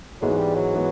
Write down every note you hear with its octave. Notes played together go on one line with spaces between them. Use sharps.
G#2 E3 F#3 G#3 B3
G3
F#3
E3 G#3 B3